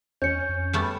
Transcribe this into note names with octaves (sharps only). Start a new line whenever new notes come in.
E2 C#4 G6 C#7
F2
G3 A3 B3